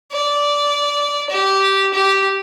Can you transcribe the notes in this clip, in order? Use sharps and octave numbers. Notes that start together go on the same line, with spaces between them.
D5
G4
G4